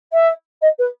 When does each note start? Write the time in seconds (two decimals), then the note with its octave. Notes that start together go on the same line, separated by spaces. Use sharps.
0.13 E5
0.61 D#5
0.79 B4